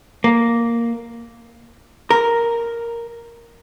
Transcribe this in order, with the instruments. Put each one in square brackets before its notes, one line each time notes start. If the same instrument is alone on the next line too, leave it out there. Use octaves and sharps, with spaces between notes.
[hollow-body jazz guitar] A#3
A#4